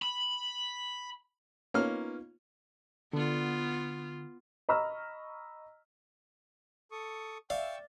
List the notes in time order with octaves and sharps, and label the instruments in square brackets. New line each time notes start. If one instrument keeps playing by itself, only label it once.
[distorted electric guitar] B5
[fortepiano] A#3 C#4 F6 [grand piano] B3 D#4 F4
[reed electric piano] D3 [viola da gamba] B3 F4
[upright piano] D#5 A#5 B5 C#6 E6 F6
[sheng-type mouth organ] A4 C#6 D#6
[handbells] D5 [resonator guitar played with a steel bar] E5 [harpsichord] F5 [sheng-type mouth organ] G5 C#6 E6